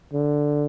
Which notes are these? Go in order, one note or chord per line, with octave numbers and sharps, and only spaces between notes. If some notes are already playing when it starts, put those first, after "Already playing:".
D3